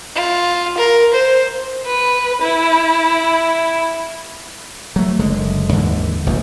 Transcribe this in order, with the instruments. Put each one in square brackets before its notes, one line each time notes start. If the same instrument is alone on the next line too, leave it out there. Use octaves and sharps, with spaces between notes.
[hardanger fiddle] F4
A#4
C5
[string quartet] B4
E4
[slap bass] F#3 A3
F#1 D3 G#3
D#2 G#2 D3 E3
F1 A#1 D#2